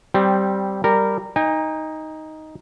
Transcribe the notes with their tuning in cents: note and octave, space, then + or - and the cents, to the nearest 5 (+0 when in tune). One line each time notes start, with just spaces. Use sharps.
G3 -10 C4 +0
G3 +0 A#4 -15
D#4 +5 G#5 -45